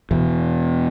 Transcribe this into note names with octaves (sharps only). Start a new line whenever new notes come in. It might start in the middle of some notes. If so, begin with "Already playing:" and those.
E2 B2